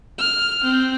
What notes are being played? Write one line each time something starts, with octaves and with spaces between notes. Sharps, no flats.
F6
C4